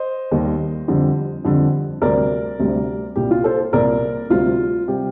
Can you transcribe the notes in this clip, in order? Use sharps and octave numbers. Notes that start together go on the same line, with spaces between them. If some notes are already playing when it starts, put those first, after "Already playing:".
Already playing: C5 D#5
D#2 D#3 G3
F2 D3 G3
F2 D3 G3
D2 C3 G3 A#4 D5
D2 C3 G3
C2 A#2 G3 G4
F4
A4 C5
C2 A#2 G3 A#4 D5
D2 C3 G3 F4
C3 G3 G4